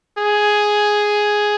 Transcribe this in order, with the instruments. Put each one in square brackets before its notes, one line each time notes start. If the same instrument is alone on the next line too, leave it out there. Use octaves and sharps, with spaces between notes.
[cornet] G#4